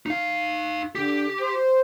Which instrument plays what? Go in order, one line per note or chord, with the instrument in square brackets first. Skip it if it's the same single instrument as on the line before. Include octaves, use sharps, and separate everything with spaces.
[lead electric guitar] D#4 F5
[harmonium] D3 [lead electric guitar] G4
[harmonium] C5